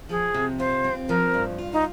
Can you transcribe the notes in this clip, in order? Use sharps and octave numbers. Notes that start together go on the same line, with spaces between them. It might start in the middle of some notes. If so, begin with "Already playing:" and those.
F3 G#4
C3
F4 C5
C4
F3 A#4
G2
F4
D#4